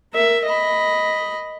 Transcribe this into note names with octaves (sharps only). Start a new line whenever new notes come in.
A#4 E5
D#5 B5